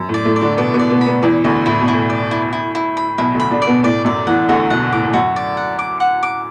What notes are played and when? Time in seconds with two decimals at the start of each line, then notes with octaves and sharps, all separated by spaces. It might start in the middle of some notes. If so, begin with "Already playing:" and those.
Already playing: F#2
0.09 A2
0.14 D5
0.25 A2 A3
0.36 D5
0.41 D3 D4
0.57 B2 B3 D5
0.74 B2 B3
0.79 D5
0.90 B2 B3
1.01 B5
1.06 B2 B3
1.22 E2 E3 D5
1.44 D2 D3 B5
1.66 A2 E4
1.80 B2
1.88 E4
1.94 A2
2.10 D5
2.31 E4
2.53 E4
2.75 E4
2.97 B5
3.18 B1 B2 E4
3.35 D2 D3 B5
3.51 D3 D4
3.62 D5
3.67 B2 B3
3.83 A2 A3 D5
4.05 F#2 F#3 D5
4.27 E2 E3 F#5
4.49 D2 D3 F#4
4.70 B1 B2 F#5
4.92 A2 D6
5.05 A2
5.13 F#2 F#4
5.36 D5
5.57 F#5
5.79 D6
6.00 F#5
6.23 D6